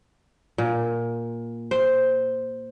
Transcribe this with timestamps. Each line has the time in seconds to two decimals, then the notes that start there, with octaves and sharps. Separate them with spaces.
0.58 A#2
1.71 C5